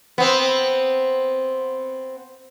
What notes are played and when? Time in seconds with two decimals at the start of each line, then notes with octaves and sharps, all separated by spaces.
0.18 B3 C4